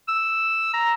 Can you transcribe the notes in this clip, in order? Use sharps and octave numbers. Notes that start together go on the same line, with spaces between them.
E6
A#5